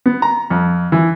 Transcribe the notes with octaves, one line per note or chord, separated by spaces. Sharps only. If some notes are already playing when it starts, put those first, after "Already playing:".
B3
A#5
F2
E3